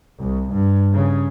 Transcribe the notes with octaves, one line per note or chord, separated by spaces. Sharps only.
C2
G2
C#3